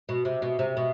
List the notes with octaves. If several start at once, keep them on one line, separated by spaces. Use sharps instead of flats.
B2
C3
B2
C3
B2